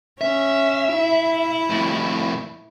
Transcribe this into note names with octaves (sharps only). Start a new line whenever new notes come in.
C#4 E5
E4
F2 A2